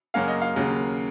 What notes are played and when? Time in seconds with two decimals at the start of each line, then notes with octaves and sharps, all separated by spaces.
0.14 F#2 C#3 F#3 A#3 C#4 F5
0.28 D#5
0.42 F5
0.56 D#2 C#3 F#3 A#3